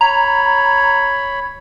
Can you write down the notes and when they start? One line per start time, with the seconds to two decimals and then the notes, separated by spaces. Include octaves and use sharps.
0.01 C#5 A#5 B5